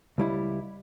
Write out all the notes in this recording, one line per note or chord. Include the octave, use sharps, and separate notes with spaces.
C#2 G3 E4